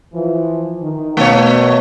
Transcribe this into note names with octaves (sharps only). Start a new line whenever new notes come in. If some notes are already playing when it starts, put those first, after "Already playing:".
E3 F3
D#3
B2 A3 C#5